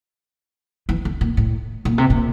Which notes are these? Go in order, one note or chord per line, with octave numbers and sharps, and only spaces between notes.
E3
D3
A#2
A2
A#2
C3
A#2